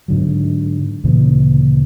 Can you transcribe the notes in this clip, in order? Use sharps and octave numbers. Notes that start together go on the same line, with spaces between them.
G#2 D3 F#3
D2 A#2 C#3 E3